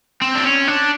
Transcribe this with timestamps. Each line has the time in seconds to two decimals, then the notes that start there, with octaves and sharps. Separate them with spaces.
0.22 C4
0.35 D4
0.44 C#4
0.68 D4